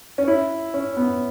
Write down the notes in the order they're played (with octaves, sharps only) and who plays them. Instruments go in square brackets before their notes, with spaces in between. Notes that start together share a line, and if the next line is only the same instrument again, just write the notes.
[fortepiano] C#4
E4
C#4
B3